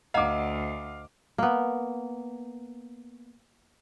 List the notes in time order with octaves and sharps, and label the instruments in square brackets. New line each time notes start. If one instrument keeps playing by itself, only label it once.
[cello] D2 [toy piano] D#5 F#5 A#5 [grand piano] F5 D6
[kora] A#3 B3